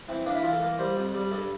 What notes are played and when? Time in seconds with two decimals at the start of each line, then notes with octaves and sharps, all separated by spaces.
0.09 E3 C4
0.26 A#3 D4
0.35 E4
0.43 E3 F4
0.53 A4
0.61 A#3 A#4
0.79 G3 C5
0.97 F2
1.14 G3
1.31 G2 A4